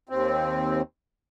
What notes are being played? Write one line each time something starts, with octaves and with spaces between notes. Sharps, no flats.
D#2 C4